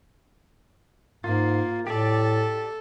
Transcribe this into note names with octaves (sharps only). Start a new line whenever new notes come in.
G#2 A#3 F4
A2 G4 A4 D5